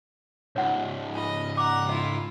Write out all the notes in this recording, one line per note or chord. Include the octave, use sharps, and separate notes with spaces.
C#2 G#2 C#5 F#5
F4 D#5 A5
F#5 A#5 D6
E4 F4 D#5